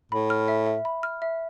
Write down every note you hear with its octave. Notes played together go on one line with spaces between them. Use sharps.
A2 B5
F6
E5
E5
B5
F6
E5